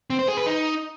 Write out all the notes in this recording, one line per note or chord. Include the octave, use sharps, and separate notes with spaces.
C4
C5
G#4
B4
D#4